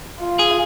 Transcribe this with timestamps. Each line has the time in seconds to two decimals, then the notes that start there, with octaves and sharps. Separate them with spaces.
0.20 F4
0.39 G#4